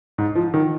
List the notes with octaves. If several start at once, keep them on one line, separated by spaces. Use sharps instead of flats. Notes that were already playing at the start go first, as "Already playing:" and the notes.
G#2
F3
D#3